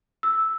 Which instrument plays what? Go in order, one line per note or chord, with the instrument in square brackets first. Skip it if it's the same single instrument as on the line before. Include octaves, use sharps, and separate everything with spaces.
[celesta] E6